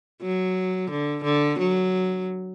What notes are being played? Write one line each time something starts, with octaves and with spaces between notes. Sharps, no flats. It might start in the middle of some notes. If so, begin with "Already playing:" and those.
F#3
D3
D3
F#3